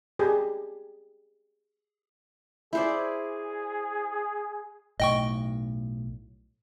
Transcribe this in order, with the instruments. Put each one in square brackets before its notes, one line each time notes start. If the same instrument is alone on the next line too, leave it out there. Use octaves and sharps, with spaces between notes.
[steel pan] G4 G#4
[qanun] E4 C5 D5 [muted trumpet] G#4
[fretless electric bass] B1 A2 [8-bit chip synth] D#5 G5 C#6